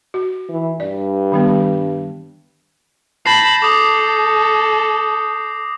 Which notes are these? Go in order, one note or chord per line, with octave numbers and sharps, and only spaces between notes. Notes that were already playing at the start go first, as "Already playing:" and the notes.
F#4
E3
G2 D5
D#3 G3 B3
A5 B5 G6 A#6 C7
A4 D6 D#6